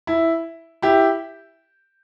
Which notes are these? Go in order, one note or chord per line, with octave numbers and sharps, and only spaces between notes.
E4
E4 G4